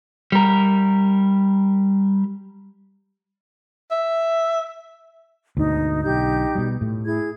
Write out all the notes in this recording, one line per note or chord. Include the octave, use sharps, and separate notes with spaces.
G3 A#4
E5
D2 G#2 B2 D#4
B1 D3 D#4 G4 G6
B2 G3
A2 A3
E4 G#4 G#6